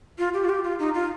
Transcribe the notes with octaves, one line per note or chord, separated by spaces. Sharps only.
F4
G4
F4
G4
F4
D#4
F4